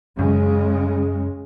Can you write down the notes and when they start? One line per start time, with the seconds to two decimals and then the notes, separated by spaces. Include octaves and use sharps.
0.19 F#2 C#3 G#3